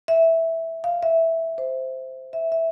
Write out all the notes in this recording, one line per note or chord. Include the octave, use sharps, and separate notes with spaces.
E5
F5
E5
C5
E5
E5